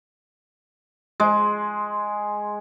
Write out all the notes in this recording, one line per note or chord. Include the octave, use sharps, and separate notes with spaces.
G#3